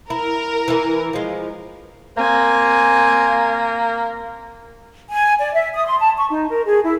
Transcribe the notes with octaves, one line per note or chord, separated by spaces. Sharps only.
E4 A#4
E3 E4
F3 G#3
A#3 C4 G#5
G#5
D5
E5
D#6
C6
A5
C#6
D#4
A#4
G#4
E4